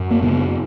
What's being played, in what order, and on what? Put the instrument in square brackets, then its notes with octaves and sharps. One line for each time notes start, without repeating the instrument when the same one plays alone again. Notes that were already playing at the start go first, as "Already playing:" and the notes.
Already playing: [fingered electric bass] F#2
A#3
C#3 B3